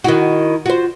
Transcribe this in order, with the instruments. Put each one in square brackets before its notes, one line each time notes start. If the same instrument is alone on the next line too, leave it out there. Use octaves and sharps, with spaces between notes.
[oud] D#3 F#4 [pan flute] E4
[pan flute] F4 [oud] F#4 C5